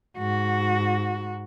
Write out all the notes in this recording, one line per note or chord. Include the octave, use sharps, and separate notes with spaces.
G#2 F#4